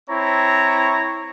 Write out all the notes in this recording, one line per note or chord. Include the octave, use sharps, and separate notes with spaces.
C4 E4 C#5 A#5